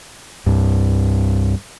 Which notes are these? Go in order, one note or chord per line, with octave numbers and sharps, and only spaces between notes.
C2 G2